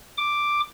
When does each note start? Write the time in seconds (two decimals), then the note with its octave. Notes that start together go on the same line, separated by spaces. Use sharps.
0.17 D6